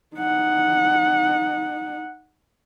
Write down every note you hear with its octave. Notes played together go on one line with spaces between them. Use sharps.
D#4 F#5